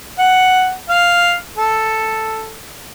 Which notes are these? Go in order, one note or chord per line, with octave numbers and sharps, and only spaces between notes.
F#5
F5
A4